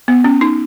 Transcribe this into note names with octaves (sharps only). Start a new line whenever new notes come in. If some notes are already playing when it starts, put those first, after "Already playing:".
B3
C#4
D#4